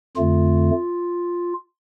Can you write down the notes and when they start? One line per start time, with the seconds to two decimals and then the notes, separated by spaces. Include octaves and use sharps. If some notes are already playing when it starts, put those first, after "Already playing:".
0.17 F2 D3 A3 F4